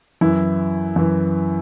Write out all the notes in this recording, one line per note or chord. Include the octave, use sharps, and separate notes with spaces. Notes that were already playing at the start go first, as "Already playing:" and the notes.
F#2 E3 E4
F#2 E3